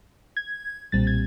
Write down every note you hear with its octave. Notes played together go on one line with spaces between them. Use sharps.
G#6
B1 A#2 G3 C4 A6
G#6